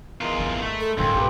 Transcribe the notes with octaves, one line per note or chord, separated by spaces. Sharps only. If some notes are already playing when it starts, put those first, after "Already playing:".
E2 G#3 F4 A#4
G#1 F2
A3
A4
C#2 G#2 F3 C4
B1 G#2 G4 B4